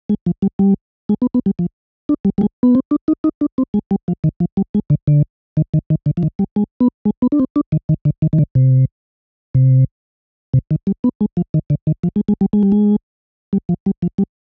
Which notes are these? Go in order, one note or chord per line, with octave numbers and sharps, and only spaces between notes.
G#3
F3
G3
G3
G#3
B3
B3
G3
F3
D4
G3
G3
G#3
B3
C4
D4
D#4
D#4
D4
C4
G#3
G3
F3
D#3
F3
G3
G#3
D3
D3
D#3
D#3
D#3
D3
F3
D#3
G3
G#3
B3
G#3
B3
D4
C4
D4
D#3
D#3
D3
D#3
D#3
D3
C3
C3
C3
D#3
G3
B3
G#3
F3
D#3
D3
D#3
F3
G#3
G#3
G3
G#3
G3
G#3
G3
F3
G3
F3
G3